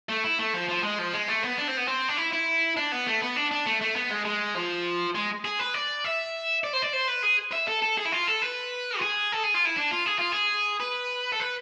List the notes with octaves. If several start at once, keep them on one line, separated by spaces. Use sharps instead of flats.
A3
E4
A3
F3
F3
G#3
F3
G#3
A3
B3
D4
C4
B3
C4
D4
E4
E4
D4
B3
A3
B3
D4
D4
A3
A3
B3
G#3
G#3
F3
G#3
G#4
B4
D5
E5
D5
C5
D5
C5
B4
G#4
E5
A4
A4
G#4
E4
F4
A4
B4
F4
G#4
A4
G#4
F4
E4
D4
F4
G#4
F4
G#4
B4
A4
B4